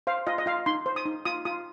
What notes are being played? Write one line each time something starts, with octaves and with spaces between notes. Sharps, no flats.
C5 F5
F4 D#5
D#5
F4 F5
D#4 C6
C5
D#6
D#4
F4 D#6
F4 D#6